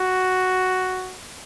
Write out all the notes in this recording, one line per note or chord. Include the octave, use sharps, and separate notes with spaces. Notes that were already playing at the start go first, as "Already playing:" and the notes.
Already playing: F#4